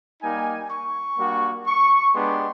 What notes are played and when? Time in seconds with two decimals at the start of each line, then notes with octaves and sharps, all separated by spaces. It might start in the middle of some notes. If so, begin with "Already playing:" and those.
0.22 G3 A#3 D#4 G#5
0.70 C#6
1.18 G3 A#3 D4 F#4
1.66 C#6
2.14 G#3 B3 D4 G4 C6